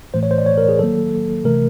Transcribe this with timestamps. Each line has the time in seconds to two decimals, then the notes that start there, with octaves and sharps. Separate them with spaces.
0.14 A2 E3 A3 C5
0.23 C#5
0.31 C5
0.38 D5
0.46 C#5
0.58 A#4
0.69 G#4
0.79 D#3 F#3 A#3 A4
1.44 C3 E3 A3 A#4